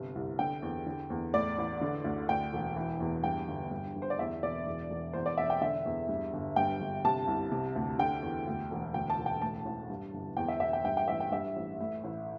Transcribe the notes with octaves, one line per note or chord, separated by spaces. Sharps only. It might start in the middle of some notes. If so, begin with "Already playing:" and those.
Already playing: G1 C3
C2
D3 G5
E2
D3
E2
A2 D5
A1
D3
D2
D2 G5
E1
E3
E2
G2 G5
G1
G2
G1
C5
D5
E2 E5
E1 D5
E2
E1
E2 C5
D5
E1 E5
G5
D3 E5
E2
G2
G1
G2 G5
G1
C3 A5
C2
C3
D2
D3 G5
E2
D2
E1
D2 G5
A5
E1
G5
A2 A5
A1
G2
G1
E2 G5
E5
E1 E5
G5
G2 G5
G5
A1 E5
G5
G2 E5
A1
A2
A1